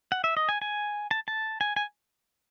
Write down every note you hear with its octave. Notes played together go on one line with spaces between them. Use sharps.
F#5
E5
D#5
G#5
G#5
A5
A5
G#5
G#5